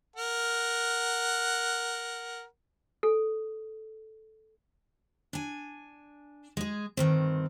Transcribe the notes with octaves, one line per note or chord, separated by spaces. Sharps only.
A#4 F#5
A4
D4 G#5
G#3 G#4
G2 D#3 C4